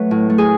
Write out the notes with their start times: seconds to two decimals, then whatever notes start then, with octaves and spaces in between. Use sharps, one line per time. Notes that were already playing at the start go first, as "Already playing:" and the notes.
Already playing: F#3 A3 B4 C#5
0.11 A2
0.30 A3
0.38 G#4